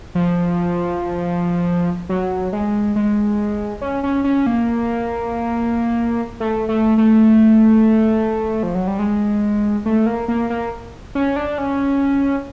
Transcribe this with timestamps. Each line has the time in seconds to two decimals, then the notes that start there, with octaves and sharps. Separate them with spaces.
0.15 F3
2.09 F#3
2.53 G#3
2.96 G#3
3.81 C#4
4.03 C#4
4.24 C#4
4.46 A#3
6.40 A3
6.69 A3
6.98 A3
8.63 F3
8.75 F#3
8.87 G3
8.99 G#3
9.86 A3
10.06 A#3
10.28 A#3
10.50 A#3
11.15 C#4
11.36 D4
11.58 C#4